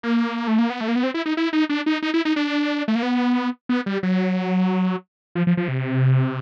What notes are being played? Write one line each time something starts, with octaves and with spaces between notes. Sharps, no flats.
A#3
A3
A#3
B3
A3
A#3
B3
C4
E4
D#4
E4
D#4
D4
D#4
D#4
E4
D#4
D4
A3
A#3
B3
B3
G3
F#3
F3
F3
F3
C3